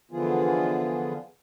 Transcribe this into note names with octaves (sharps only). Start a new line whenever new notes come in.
D3 E3 F3 B3 F4 G#4